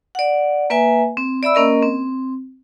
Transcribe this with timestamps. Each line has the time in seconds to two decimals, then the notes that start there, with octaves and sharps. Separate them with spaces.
0.15 D5 F#5
0.70 A#3 B4 E5 G#5
1.17 C4
1.43 D5 E5 B5 E6
1.55 A#3 C#4 A#4 D#5
1.82 C4